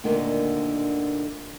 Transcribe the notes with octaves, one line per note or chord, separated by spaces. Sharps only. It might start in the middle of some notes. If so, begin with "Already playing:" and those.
D2 A#2 D3 D#3